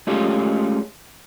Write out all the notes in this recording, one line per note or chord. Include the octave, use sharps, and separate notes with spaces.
G#3 A3 C#4 F4 G4 G#4